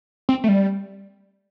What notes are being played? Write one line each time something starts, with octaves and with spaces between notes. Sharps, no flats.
C4
A3
G3